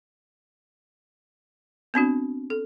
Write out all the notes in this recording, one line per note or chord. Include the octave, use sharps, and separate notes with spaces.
B3 C4 D4 F#4
A4